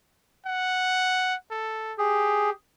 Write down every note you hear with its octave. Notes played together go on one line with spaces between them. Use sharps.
F#5
A4
G4 G#4